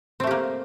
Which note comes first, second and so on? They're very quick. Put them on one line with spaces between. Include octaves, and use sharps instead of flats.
C4 A3 G4 A#3